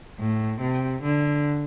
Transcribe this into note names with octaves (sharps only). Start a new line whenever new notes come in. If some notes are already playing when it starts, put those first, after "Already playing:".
A2
C3
D3